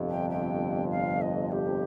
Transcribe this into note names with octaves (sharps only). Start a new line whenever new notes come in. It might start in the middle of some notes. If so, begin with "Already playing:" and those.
Already playing: G1 F2 C3
G5
G5
F5
D#5
G4